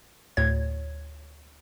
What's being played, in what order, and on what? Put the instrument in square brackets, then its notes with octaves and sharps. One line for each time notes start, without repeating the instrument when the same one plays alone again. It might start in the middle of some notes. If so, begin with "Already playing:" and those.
[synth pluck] D2 A2 C#5 G#6